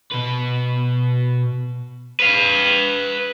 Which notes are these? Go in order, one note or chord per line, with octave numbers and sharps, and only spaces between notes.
B2 B4
B4 F5